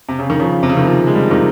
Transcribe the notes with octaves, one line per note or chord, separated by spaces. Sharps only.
C3
C#3
D#3
C#3 F3
C3
C#3
D#3
C#3 F3
G#3
G3
F3
C3 D#3